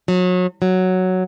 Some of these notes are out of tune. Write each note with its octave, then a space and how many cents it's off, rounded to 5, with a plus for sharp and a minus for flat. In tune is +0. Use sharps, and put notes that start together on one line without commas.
F#3 -30
F#3 +0